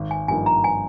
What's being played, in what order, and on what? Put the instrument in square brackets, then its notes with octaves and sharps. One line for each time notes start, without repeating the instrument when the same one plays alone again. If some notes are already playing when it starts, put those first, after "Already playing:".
Already playing: [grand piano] G#1
[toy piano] G#5
[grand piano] G2 F3 A#3 D#4 [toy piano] G#5
[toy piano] A#5
G#5